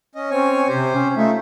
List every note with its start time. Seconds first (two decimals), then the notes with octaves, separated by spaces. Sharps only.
0.15 C#4 D#5
0.31 C4 C#4 C#5 G#5
0.68 C3 G4 C5
0.95 C#4
1.17 A3 D#4 F4 E5